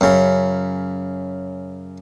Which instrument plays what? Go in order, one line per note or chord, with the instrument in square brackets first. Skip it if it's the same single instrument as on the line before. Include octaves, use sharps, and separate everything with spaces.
[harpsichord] F#2 C#3